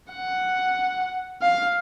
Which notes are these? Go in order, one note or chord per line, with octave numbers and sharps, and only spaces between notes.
F#5
F5